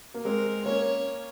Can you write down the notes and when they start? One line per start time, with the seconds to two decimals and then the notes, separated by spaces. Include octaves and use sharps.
0.14 A#3
0.25 G#3 C4 A#4
0.66 A#3 C#4 C#5